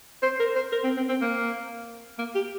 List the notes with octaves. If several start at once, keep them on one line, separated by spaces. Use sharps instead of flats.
C5
A#4
C5
A#4
C4
C4
C4
A#3
A#3
G4